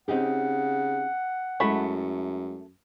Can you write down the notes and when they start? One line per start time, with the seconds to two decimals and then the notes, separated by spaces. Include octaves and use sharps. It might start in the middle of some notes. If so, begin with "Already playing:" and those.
0.08 C#3 C4 D#4 G4 F#5
1.60 F#2 G#3 A3 E4 F#4 B5